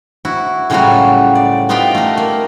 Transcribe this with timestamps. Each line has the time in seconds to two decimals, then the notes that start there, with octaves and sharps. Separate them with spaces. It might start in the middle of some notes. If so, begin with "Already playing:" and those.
0.25 E4 F#4
0.70 A2 C#3 F#3 G3 F4 F#4
1.35 D5
1.69 B3 D#4 F4 G4 F5 G5
1.95 A3 A#4
2.18 A#3